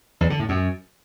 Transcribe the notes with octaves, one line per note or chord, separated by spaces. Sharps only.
E2
D3
A2
F#2